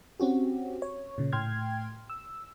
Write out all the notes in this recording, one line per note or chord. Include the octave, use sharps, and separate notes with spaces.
C4 C#4 F#4 G4
C#5
A#2 C#3
A2 G5 C6 F6 G#6
E6